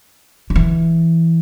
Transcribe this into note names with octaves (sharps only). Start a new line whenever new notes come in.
D#3
E3